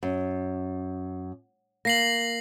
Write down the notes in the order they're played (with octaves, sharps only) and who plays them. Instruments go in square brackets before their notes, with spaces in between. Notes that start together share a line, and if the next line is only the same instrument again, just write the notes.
[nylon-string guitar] F#2
[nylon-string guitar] A#3 [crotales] A#6 C7 F#7